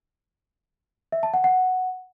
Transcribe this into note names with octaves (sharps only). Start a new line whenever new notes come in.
E5
A5
F#5
F#5